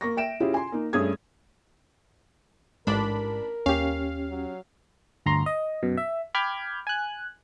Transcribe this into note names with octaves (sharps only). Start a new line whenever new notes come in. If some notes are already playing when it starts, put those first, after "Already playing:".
A#3 C#6 A#6
E5 G5 D7 E7
C#4 E4 F4 G4 G#4
G#5 C6
A#3 D#4
G2 A3 C#4 G#4 D#6 G#6
A1 G#2 G#3 D4 A#4 B5
D#2 C#4 G4 F5
F#3
G1 D2 A#5 C6
D#5
F#2 B2
E5
G5 B5 D6 F6 G6 G#6
G#5 F#6